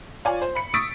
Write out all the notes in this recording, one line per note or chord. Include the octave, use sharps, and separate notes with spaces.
F4 C#5 D5 G#5
C5
B5 C#7
C#6 D#6 E6 A6 B6 D7